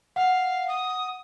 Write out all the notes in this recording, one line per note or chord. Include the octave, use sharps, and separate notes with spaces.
F5 F#5
D#6